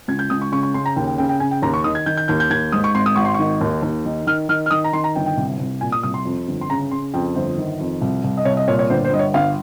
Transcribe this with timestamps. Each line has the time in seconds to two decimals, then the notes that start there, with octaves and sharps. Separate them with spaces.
0.08 C#2 G#6
0.19 G6
0.30 C#2 D#6
0.42 C#6
0.52 C#3 C#6
0.63 C#6
0.74 C#3 C6
0.86 A#5
0.96 D#2 G5
1.07 G5
1.18 C#3 G5
1.29 G5
1.40 C#3 G#5
1.51 G5
1.62 D#2 A#5
1.74 C#6
1.84 D#3 D#6
1.95 G#6
2.06 D#3 G6
2.17 G6
2.28 D#2 G6
2.40 G6
2.51 D#2 G#6
2.72 G#2 D#6
2.84 C#6
2.95 G#1 C6
3.06 D#6
3.16 G#1 C#6
3.25 C6
3.34 D#3 C#6
3.61 D#2
3.82 D#2
4.05 D#3
4.27 D#3 F6
4.49 D#3 F6
4.66 F6
4.71 D#3 D#6
4.84 A#5
4.93 D#3 C6
5.04 A#5
5.16 G1 G5
5.26 G5
5.37 C2
5.59 C2
5.81 A#2 G#5
5.92 D#6
6.03 C2 D#6
6.14 C6
6.25 F2
6.47 G1
6.61 C6
6.70 C#3 A#5
6.91 C#3 C6
7.14 F2 G5
7.35 G1 C5
7.58 D#3
7.80 F2
8.02 C2
8.24 C2
8.37 D#5
8.45 C2 C#5
8.57 D#5
8.68 A#2 C#5
8.79 C#5
8.90 G1 C5
9.05 C5
9.12 G2 D#5
9.19 C#5
9.34 G1 F5